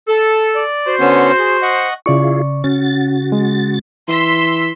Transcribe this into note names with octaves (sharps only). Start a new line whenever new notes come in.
A4
D5
F#4 C5
D3 B3 C#4
G#4
D#5 F#5 C#6
C#3 E4 F4 G#4 D5 C#6
C#3 C#4 F#4 A6
G#3
E3 C6 E6 B6